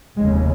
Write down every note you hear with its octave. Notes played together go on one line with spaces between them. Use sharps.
F1 D#2 C#3 G#3